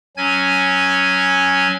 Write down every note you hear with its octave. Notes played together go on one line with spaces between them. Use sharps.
F#3 C#4 G#5 G#6